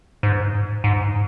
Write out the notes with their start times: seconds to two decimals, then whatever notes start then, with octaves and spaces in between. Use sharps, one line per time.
0.23 G#2
0.84 G#2